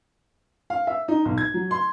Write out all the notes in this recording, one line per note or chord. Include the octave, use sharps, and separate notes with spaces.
F5
E5
D#4
B1
G#6
F#3
C6